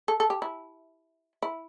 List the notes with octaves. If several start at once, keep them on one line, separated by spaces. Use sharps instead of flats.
A4
A4
G4
E4
E4